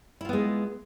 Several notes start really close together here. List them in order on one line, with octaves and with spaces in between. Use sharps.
E4 F4 B3 G#3